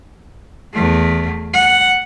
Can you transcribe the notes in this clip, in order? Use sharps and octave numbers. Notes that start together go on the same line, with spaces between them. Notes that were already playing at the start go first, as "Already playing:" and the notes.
E2 A3
F#5